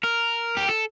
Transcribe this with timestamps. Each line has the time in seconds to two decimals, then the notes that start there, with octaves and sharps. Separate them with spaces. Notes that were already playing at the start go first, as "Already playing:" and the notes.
0.04 A#4
0.57 G4
0.68 A4